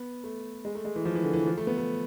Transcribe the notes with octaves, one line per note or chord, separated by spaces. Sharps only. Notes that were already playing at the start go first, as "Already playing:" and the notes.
Already playing: B3
A3
G#3
A3
G#3
E3
F3
E3
D3
E3
F3
A3
B3
A3